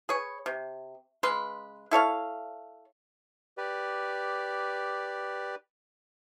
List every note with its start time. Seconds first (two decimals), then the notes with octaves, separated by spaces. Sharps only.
0.09 G#4 B4 C#5
0.46 C3
1.23 C#3 G#3 B4 C6
1.91 E4 A4 C#5 F5
3.58 G4 B4 D5